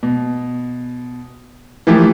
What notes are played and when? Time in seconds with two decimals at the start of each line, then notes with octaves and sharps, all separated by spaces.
0.03 B2
1.87 E3 F3 A3 A#3 G4